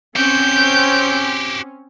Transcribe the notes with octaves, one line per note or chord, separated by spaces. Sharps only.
C4 C#4 F#4 G4 G6